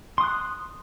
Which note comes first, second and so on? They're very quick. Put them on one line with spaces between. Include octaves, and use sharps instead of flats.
C6 D#6 F#6